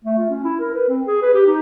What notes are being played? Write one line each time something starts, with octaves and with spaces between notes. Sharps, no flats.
A3
F4
C#4
E4
A#4
B4
C4
G#4
B4
G4
D#4